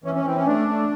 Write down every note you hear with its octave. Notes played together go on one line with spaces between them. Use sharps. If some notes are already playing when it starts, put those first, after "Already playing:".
E3 C#4
C#4
E3 C4
C#4
A3 D4
A3